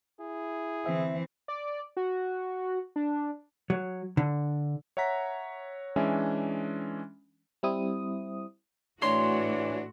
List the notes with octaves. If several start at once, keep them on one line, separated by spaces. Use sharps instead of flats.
E4 G#4
D3 E3 C4 E5
D5
F#4
D4
F#3
D3
C#5 E5 F#5 A#5 B6
E3 G#3 C#4 D4 E5
G3 C4 E4 D#6
A2 E3 A3 D4 F#4 C#5 C6